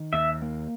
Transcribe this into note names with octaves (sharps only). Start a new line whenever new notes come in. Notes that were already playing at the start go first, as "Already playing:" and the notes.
Already playing: D#3
D#2 E5
A#3